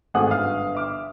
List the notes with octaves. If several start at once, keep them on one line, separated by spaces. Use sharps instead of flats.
G#1 G#3 A3 F#5 G#5 D#6
G1 F5 F6
E5 D6 F6